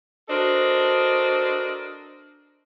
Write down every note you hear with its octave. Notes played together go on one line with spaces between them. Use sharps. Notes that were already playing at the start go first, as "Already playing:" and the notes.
D4 F#4 A4 A#4 C5 D#5